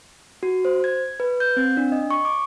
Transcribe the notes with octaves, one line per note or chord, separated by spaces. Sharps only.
F#4
C5
G#6
B4
G6
C4
D4
D#5
C#6
D6